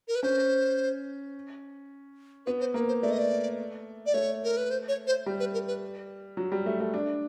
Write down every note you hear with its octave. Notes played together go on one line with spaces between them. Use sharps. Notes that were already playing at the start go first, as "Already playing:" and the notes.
A#4
B4
C#4 C5
B3 B4
C5
A#3 B4
C5
A3 D5
D#5
D5
D5
A3 C#5
A#4
B4
C5
C#5
C5
G3
B4
A#4
B4
F#3
G3
A3
A3
D4